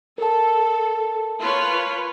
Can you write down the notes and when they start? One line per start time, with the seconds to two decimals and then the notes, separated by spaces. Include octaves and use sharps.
0.18 A4 A#4 A5
1.40 F4 B4 C#5